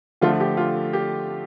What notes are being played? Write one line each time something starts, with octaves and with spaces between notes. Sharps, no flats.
D3 F3 A3 F4
G4
F4
G4